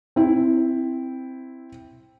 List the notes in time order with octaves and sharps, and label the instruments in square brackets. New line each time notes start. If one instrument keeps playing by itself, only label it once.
[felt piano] C4 E4